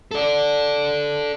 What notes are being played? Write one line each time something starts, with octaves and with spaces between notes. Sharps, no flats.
A4 D5